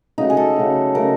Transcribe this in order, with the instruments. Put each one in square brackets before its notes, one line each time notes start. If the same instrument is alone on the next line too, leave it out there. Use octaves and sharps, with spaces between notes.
[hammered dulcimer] C#3 F#3 A3 D#4
G#4
A4
C#3 F#3 A3
C#3 F#3 A3 A#4